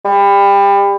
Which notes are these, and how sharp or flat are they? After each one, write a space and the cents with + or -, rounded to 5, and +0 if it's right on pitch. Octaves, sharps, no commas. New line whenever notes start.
G3 +30